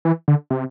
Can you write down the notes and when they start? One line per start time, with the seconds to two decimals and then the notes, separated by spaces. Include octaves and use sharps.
0.05 E3
0.28 D3
0.50 C3